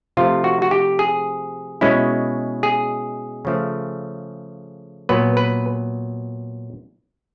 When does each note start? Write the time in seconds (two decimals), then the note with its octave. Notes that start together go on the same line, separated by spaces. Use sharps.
0.17 C3 F3 A3 F4
0.44 F#4
0.62 F#4
0.71 G4
0.99 G#4
1.81 B2 G#3 C#4 E4
2.63 G#4
3.45 C#3 F3 A3
5.09 A#2 F#3 B3 B4
5.37 B4